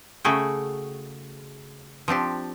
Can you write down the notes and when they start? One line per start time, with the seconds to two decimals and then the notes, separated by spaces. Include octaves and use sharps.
0.24 C#3 A3 F#4 G#4 G5
2.08 F3 C4 D4 G4